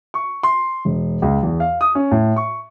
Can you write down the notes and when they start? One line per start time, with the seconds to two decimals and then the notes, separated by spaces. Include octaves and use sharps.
0.14 C#6
0.43 C6
0.85 E1
1.22 C#2
1.43 E2
1.60 F5
1.81 D#6
1.95 C#4
2.11 A2
2.36 C#6